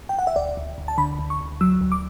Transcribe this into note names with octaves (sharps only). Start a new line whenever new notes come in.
G5
F#5
E5
D2 D5
D2
D2
A5
D3 B5
D2
C#6
D2
F#3 E6
D2
D6